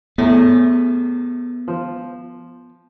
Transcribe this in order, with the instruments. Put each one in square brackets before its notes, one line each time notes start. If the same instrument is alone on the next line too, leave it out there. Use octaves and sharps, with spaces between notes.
[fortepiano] E2 A2 [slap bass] B3
[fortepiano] F3